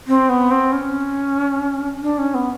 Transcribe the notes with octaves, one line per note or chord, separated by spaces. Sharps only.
C4
B3
C4
C#4
D4
C#4
B3